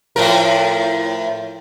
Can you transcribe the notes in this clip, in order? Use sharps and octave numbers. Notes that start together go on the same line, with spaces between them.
A2 F3 A#4